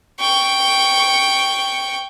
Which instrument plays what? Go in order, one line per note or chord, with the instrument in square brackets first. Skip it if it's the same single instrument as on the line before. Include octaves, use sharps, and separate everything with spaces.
[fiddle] G5 C#6